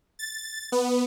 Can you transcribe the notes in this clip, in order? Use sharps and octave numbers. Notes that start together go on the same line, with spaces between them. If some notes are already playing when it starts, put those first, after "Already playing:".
A6
B3